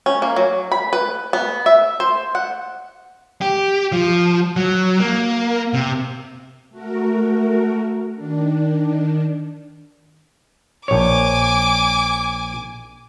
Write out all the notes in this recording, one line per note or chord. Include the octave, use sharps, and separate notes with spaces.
C#4
A#3
F#3
B5
B4
B3
E5
C5
F#5
G4
F3
F#3
A#3
C3
A3 F#4 A#4
D#3 D4
A#1 C#5 G#5 D6